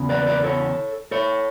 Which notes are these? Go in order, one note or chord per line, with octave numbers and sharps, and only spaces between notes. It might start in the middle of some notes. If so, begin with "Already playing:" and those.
Already playing: E2 C#3 E3 B3
B4 D5
B4 D5
A4 C#5
A4 C#5